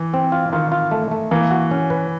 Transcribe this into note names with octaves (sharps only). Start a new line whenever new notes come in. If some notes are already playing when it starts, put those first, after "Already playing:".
Already playing: E3
C4
F4
D#3 F4
F4
A3
A3
E3 A#3
F#4
C#4
B4